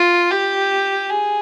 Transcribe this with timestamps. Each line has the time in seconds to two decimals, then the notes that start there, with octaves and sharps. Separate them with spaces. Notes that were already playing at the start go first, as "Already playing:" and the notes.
Already playing: F4
0.31 G4
1.10 G#4